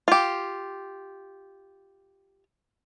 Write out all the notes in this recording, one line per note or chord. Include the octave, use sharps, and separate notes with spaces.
F4 G4